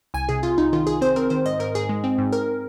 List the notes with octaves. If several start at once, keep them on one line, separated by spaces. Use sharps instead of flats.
C2 G#5
C3 G#4
C3 F4
C2 D#4
D#3 F4
C2 G#4
C4 C5
C4 A#4
D#3 C5
G#2 D#5
G#2 A#4
G#2 G#4
G#3
C4
G#2
G#2 A#4